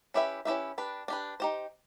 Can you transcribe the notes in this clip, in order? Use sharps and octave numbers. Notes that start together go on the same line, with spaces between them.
C#4 E4 G4 B4 E5
C#4 E4 G4 B4 E5
D4 G4 B4
D4 G4 B4
D#4 G4 C5